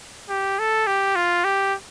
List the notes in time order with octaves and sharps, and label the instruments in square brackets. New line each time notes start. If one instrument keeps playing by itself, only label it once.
[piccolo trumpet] G4
A4
G4
F4
G4